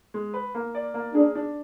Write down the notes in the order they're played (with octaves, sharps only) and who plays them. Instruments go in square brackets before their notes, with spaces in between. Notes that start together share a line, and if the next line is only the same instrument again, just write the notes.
[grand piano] G#3
B4
A#3
D5
A#3
[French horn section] D4 [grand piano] G#4
[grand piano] D4